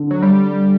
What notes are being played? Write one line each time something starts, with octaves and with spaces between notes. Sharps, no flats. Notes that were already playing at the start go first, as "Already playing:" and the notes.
Already playing: D3
F#3
G3